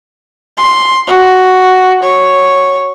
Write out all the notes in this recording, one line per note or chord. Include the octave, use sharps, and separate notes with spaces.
C6
F#4
C#5